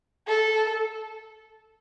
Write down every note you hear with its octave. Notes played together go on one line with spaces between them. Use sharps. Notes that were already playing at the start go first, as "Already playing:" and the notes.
A4